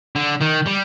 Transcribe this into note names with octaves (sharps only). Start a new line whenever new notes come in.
D3
D#3
G3